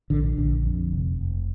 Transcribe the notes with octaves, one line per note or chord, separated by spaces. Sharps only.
A#1 D3
A#1 D3
F2
F1
F1